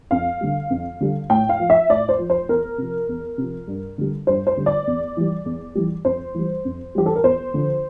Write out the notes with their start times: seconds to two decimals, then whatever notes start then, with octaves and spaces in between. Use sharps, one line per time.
0.11 F2 F5
0.41 D3 G3
0.70 F2
1.01 D3 G3
1.30 A2 G5
1.49 F5
1.60 F3
1.70 E5
1.89 A2 D5
2.09 C5
2.19 F3
2.30 C5
2.48 E2 A#4
2.78 C3 F3
3.09 E2
3.38 C3 F3
3.67 G2
3.98 D3 G3
4.27 G2 C5
4.47 C5
4.57 D3 G3
4.66 D5
4.87 E2
5.17 E3 G3
5.46 E2
5.75 E3 G3
6.05 F2 C5
6.34 E3 G3
6.65 F2
6.95 E3 G3 G4
7.06 A4
7.16 A#4
7.24 E2 C5
7.54 D3 F3